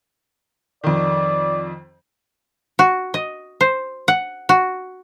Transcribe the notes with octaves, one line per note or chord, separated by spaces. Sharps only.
F2 D#3 D5
F#4
D#5
C5
F#5
F#4